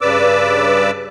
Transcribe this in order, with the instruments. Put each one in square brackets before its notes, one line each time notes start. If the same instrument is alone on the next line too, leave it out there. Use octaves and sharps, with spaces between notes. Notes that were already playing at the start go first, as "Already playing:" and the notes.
[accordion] G2 C#3 B4 D5 D6 E6